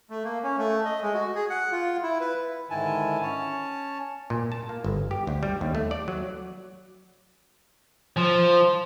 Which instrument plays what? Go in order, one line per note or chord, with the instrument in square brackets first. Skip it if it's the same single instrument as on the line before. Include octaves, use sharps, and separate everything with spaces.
[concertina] A3
A#3
C#4
A3
D#5
G#3
F#4
G#4
F#5
F4
E4
B4
[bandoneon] G#2 D3 D#3 E4 G#5 A5
C#4 C#5 A5
[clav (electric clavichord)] A#2
A5
A#3
G1
G4
D2
G3
D#2
A3
D5
F#3
[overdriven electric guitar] F3